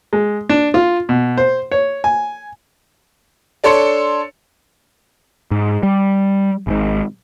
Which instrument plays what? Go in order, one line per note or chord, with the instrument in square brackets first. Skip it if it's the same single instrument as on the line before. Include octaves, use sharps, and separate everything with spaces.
[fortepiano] G#3
D4
F4
B2
C5
C#5
G#5
[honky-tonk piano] D4 A4 C#5 C6 C#7
[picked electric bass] G#2
G3
G#1 G#2